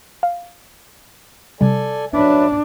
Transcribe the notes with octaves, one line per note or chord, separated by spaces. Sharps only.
F5
C3 G3 A4 D5 G#5
F#3 D4 B4 E5